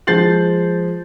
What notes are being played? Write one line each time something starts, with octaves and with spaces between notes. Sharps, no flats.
F3 G#3 G6 A6 C7 F#7